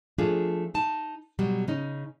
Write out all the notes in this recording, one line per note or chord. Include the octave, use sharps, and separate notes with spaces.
F3 A3 D4 F4 G#4
D#4 A5
B2 F#3 G3
C#3 C#4 D#4